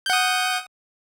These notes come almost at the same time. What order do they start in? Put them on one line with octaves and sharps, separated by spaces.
G6 F#5 D#6